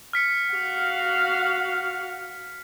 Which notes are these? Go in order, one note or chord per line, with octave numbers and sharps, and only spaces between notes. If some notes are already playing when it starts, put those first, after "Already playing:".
F6 B6 C#7
F#4 F5